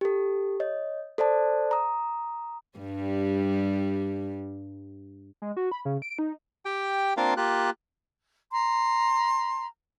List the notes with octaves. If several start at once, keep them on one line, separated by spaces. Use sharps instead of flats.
G4 A4
C#5 D#5
A4 C5 D5 A5
A#5 D#6
G2 G3
G#3
F#4
B5
C#3
D7
D#4
G4 G5
A#3 C4 D4 F4 A#4 F5
A#3 F4 G4 F#6
A#5 C6